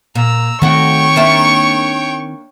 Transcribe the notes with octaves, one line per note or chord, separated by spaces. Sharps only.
A#2 A#5 E6
D#3 A3 C4 F#4 C#5 G5 C#6
A#3 D4 E5